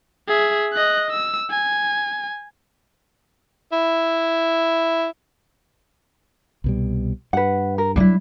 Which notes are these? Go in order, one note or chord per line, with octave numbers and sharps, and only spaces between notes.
G#4 E5
D#5 F#6
E6
G#5
E4
C2 B2 G3
G2 B4 F#5
A#4
F#3 G3 D4 E4